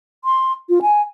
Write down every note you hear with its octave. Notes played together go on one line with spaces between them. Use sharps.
C6
F4
G#5